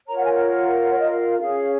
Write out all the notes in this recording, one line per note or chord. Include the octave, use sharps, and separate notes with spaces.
F4 A#4 C#5 A#5
F#5
G#5
F#5
C#5
D#5
F5
C#4 G#4 C#5 F5